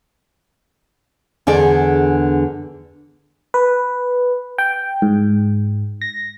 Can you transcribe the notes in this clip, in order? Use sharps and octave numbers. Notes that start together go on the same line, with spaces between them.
E2 D3 G#4 D5
B4
G5
G#2
A#6